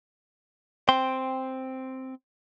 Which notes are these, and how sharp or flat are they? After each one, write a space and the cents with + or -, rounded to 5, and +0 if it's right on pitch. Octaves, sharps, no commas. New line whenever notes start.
C4 +0 G5 +5 C6 +0